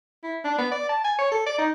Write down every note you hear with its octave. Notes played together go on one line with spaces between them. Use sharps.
E4
D4
B3
D5
A5
G#5
C#5
A4
D5
D#4